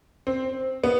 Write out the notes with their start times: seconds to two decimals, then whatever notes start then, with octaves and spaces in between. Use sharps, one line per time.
0.27 C4
0.84 B3